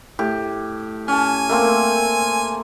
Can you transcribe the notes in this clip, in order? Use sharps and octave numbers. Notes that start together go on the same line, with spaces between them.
A2 G4
C#4 G#5 A5
A3 A#3 C4